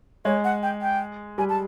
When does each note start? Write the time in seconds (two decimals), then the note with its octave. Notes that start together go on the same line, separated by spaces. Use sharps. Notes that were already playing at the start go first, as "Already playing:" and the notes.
0.25 G#3 C#5
0.44 F#5
0.63 G5
0.82 G5
1.38 G3 G#5
1.49 A5